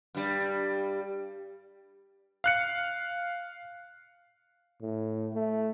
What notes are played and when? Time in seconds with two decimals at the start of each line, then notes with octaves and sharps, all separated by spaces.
0.15 G2 G3
2.44 F5 F#6 C#7
4.82 A2
5.34 A3